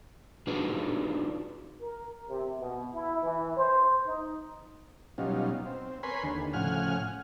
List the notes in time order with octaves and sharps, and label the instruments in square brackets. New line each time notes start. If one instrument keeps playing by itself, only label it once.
[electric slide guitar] D4 D#4 F4 F#4 G#4 B4
[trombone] A#4
C3
B2
E4
E3
C5
D#4
[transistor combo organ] B2 F#3 G3 C#4 D#4 F4
C4
A#4 B4 C#5 G#5 B5 C6
D#2 D3
A2 C#3 F3 F#5 G#5 F6